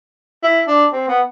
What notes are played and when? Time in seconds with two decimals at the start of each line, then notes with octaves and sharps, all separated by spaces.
0.43 E4
0.68 D4
0.93 C4
1.08 B3